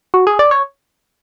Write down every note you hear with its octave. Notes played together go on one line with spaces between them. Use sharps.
F#4
G#4
D5
C#5